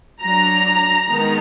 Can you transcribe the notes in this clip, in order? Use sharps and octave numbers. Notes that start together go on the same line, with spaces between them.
F#3 D4 A#5
D#3 G#3 B3